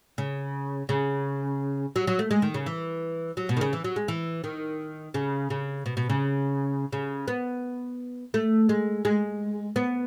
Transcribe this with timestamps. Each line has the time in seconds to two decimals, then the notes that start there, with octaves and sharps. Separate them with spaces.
0.18 C#3
0.89 C#3
1.96 F#3
2.07 F#3
2.19 A3
2.31 G#3
2.42 D#3
2.54 C#3
2.66 E3
3.37 F#3
3.49 B2
3.57 D#3
3.61 C#3
3.73 E3
3.84 F#3
3.96 G#3
4.08 E3
4.44 D#3
5.14 C#3
5.50 C#3
5.86 B2
5.97 B2
6.10 C#3
6.92 C#3
7.28 B3
8.34 A3
8.69 G#3
9.05 G#3
9.76 B3